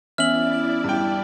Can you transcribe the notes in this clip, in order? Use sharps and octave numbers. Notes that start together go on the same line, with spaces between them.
E3 B3 C#4 E4 D5 E5 F6 F#7
G2 G5